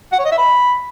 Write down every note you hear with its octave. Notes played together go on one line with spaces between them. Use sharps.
F#5
C#5
D#5
E5
B5